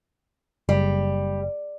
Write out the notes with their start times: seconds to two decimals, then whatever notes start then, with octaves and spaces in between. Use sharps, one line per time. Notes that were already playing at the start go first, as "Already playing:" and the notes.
0.69 F#1 G3